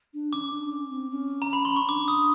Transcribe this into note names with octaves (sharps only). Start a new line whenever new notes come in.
D4
C#4 D6
D4
C#4
C4
C#4
A#5
B5
C6
C#6
D4 D6
D#6